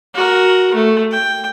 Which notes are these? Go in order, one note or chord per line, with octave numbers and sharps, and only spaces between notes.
F#4 A#4
A3
G5